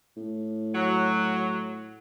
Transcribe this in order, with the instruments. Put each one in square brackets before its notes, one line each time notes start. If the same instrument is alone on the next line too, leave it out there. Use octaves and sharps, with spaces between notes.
[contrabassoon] A2
[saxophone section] F#3